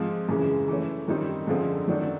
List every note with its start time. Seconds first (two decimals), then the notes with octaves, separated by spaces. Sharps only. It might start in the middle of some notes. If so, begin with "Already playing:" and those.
Already playing: G#2 F3 G#3 C4
0.29 F#2 C#3 E3 G#3
0.68 E3 A3 C#4
1.08 F#2 D#3 G3 C4 D#4
1.47 F#2 D3 F3 G#3 C4
1.88 F#2 D#3 F#3 A3 D4